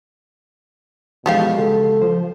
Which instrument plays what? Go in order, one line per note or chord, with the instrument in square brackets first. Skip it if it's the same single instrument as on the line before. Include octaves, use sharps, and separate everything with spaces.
[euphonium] B2 [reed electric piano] E3 F3 G#3 [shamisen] A3 G4 F5
[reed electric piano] C#3 G#3 [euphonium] A4
[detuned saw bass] F3 [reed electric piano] C5